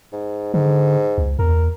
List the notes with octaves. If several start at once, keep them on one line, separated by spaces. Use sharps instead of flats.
G#2
G#2 D3
C#2
E2 A#4